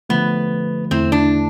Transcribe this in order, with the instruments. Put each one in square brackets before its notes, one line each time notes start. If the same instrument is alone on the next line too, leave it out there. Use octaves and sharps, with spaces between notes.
[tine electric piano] D3 F3 A3 [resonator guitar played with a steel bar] B3
[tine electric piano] E2 D3 A3 E4 [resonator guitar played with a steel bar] C4
[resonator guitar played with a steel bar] D4